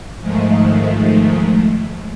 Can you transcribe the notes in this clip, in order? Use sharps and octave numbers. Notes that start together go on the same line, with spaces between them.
G#2 D#3 F3 G#3 A3